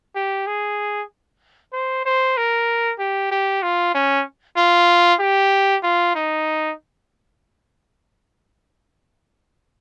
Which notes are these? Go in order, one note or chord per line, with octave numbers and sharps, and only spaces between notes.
G4
G#4
C5
C5
A#4
G4
G4
F4
C#4
F4
G4
F4
D#4